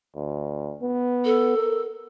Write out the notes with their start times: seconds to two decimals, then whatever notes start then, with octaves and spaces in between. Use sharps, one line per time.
0.15 D2
0.82 B3
1.25 A4
1.57 A#4